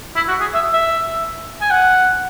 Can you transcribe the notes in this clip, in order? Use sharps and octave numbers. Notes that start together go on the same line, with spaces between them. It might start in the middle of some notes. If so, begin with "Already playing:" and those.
E4
F#4
G#4
E5
E5
G#5
F#5